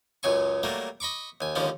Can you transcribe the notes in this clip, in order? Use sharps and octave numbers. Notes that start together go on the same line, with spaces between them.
C#2 F#2 C#3 G#5 C#6
F#3 G3 A3 A#3
D#5 B5 C#6 D6
D#2 G#5
D#2 G#2 D3 F3 C#4